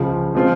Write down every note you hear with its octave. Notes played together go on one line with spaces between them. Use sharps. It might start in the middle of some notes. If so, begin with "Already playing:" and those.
Already playing: C#2 C#3 F3
F3 G#3 C4 F4